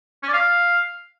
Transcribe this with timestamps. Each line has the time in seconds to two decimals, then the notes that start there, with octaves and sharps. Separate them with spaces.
0.23 C#4
0.28 D5
0.33 F5